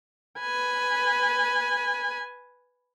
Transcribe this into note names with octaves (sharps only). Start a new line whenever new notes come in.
B4 G#5